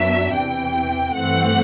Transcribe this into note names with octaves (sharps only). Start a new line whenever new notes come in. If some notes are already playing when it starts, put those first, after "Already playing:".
Already playing: F#2 F#3 B3 D4 E5
E2 C3 E3 G5
G2 E3 A3 C4 F#5